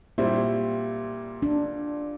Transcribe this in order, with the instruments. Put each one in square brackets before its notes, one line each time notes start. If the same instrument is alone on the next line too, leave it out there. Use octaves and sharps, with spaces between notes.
[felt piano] A#2 G3 C4 E4 [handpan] F#4
[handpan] D4